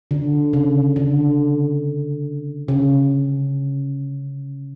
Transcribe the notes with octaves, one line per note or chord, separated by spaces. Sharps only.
D3
C#3
D3
C#3